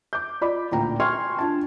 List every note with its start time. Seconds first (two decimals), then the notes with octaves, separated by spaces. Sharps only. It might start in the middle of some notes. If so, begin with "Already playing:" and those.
0.13 D6 G6
0.41 F4 D5 D#5 B5 D6
0.71 A1 D2 A#2 G5 A#5
1.00 G5 G#5 C6 C#6 F6 G#6
1.38 D4 F4 A5